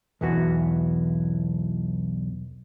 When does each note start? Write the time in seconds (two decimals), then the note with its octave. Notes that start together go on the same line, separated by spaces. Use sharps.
0.21 B1 E2 E3 B3 F#4